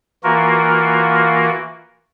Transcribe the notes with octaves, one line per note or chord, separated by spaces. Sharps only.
E3 A#3 F4 F#4 A#4